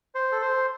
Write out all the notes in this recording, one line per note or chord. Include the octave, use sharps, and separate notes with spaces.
C5
A4
C5